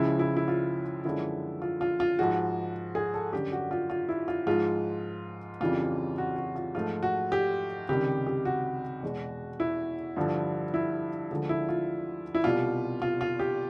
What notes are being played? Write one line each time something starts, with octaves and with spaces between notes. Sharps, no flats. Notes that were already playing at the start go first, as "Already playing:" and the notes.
Already playing: C#2 C#3 F3 G#3 E4
E4
E4
F4
F#2 D3 F3 G#3 E4
F4
F4
F4
G#2 F3 G#3 F#4
G#4
A4
F#2 D3 G3 G4
F#4
F4
F4
E4
F4
G#2 F3 G#3 F4
F2 C#3 E3 G3 F4
F#4
F#4
F4
G#2 F3 A3 F4
F#4
G4
C#2 C3 D#3 G3 G4
G4
F#4
E2 B2 G#3
E4
G2 D3 F3
E4
D2 D3 F3 G#3
E4
F4
E4
C2 B2 G3 F4
F4
F4
G4